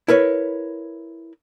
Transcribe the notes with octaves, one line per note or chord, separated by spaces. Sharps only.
E4 A#4 B4 C#5